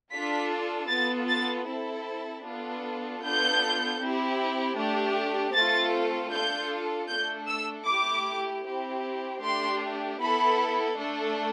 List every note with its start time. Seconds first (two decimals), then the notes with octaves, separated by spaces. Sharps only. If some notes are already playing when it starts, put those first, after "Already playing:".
0.12 D4 F4 A4 B6
0.90 B3 F4 A4 A6
1.29 A6
1.67 C4 E4 A4
2.44 B3 D4 F4 A4
3.22 B3 D4 F4 A4 G6
4.00 C4 E4 G4
4.77 A3 D4 G4
5.55 A3 C4 F4 A4 A6
6.32 D4 F4 A4 G6
7.09 A3 D4 A4 G6
7.48 E6
7.87 A3 E4 G4 D6
8.64 C4 E4 G4
9.41 A3 D4 G4 C6
10.19 B3 E4 A4 B5
10.96 A3 D4 A4